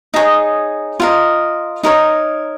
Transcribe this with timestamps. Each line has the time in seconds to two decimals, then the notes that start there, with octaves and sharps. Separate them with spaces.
0.14 D#4 G#4 C#5 A#5
1.00 F4 A#4 D#5
1.83 D#4 A#4 C#5